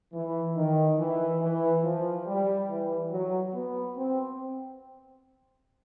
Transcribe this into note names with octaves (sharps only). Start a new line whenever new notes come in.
E3
D#3
E3
E3
F3
G3
E3
F#3
B3
C4